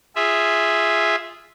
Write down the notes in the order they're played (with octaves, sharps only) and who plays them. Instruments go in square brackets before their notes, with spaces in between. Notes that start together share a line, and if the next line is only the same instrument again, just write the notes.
[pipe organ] F4 G#4 E5